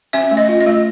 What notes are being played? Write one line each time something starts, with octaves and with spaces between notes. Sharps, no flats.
C#4 E5
A3
D#5
F4
D#5
A3